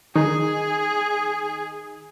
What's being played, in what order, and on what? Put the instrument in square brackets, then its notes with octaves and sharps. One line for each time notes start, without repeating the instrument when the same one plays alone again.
[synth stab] D#3 D#4 [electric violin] G#4